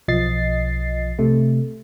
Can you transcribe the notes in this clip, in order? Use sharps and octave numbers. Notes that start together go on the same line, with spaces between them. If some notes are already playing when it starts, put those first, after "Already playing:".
B1 F3 D#5 A6 C7
C3 A3